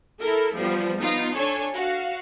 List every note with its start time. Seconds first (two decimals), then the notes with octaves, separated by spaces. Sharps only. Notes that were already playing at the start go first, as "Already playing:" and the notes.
0.20 E4 A4 A#4
0.55 F3 G3 B3
0.99 B3 D#4 F4
1.34 D4 A4 C#5 G#5
1.74 F#4 F5